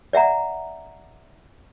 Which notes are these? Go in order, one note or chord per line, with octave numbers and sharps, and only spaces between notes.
D5 E5 F#5 A#5